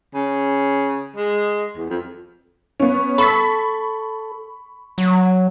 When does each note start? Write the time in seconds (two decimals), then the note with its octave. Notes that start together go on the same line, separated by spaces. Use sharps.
0.14 C#3
1.16 G#3
1.76 E2
1.90 F2
2.80 B3 C#4
3.18 A4 B5 C#6 B6
4.98 F#3